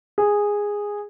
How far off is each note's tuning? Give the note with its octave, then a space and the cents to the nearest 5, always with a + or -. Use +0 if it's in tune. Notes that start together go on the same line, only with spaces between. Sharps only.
G#4 -10